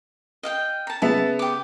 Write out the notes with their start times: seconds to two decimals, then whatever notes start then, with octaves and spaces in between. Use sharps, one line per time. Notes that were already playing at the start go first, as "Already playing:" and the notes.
0.43 D#5 F5 G5
0.87 A5 A#5
1.02 C#3 B3 E5 A5
1.39 G4 D6